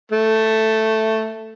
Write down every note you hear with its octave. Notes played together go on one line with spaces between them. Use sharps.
A3